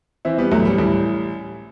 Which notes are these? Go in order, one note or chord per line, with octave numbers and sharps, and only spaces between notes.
E3 C4 E4
G3 B3
A1 F#3 A3
G3
A1 G3